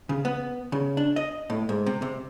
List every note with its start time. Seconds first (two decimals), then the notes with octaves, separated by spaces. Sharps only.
0.09 C#3
0.25 B3
0.72 C#3
0.97 D4
1.16 D#5
1.50 A2
1.69 G#2
1.86 C3
2.02 C3